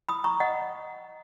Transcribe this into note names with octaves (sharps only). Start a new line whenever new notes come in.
B5 D#6
A#5 C#6
D#5 F#5